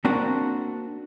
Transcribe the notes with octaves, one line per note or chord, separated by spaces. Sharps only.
A#3 C4 D4 F#4 A#4 F#5